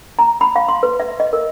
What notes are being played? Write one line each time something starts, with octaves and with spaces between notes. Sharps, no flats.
A#5
B5
F5
C6
B4
E5
D#5
A#4